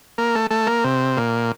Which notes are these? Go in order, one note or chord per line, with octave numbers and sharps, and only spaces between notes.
A#3
A3
A3
A#3
C3
A#2